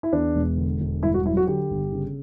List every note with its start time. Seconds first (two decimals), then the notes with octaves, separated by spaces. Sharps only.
0.03 E4
0.12 E2 D4
0.35 E1
0.57 D3
0.81 E1
1.03 G2 E4
1.14 F#4
1.25 F#3 E4
1.37 F#4
1.47 D3 G4
1.71 G1
1.92 C#3